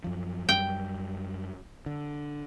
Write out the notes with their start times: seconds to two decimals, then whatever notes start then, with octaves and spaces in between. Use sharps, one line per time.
0.04 F#2 F3
0.49 F#2 G3 G5
1.86 D3